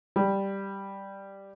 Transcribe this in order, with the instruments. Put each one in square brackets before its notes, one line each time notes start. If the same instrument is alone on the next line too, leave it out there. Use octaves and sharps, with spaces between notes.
[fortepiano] G3